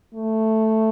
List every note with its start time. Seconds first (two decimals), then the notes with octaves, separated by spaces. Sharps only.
0.15 A3